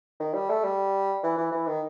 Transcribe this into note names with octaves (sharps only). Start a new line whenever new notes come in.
D#3
G3
A3
G3
E3
E3
E3
D#3